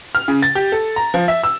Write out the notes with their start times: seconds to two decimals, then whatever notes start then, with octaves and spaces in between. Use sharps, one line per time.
0.15 F6
0.28 C#3
0.42 A6
0.55 G4
0.72 A4
0.96 A#5
1.14 F3
1.28 E5
1.43 E6